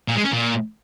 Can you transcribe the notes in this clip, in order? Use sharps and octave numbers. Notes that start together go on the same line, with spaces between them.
A#2
G#3
C#4
A#2